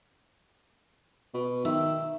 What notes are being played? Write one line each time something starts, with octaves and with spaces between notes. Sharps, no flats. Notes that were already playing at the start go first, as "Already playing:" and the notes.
B2
D#3 E5